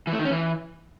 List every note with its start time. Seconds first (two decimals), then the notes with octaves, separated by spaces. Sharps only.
0.07 E3
0.13 A3
0.19 D#3
0.25 C#4
0.31 E3